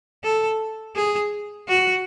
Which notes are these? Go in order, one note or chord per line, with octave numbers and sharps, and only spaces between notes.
A4
G#4
F#4